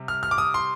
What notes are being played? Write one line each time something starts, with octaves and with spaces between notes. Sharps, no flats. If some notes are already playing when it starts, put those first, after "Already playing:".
Already playing: C3 G3
F6
F6
D6
D#6
C6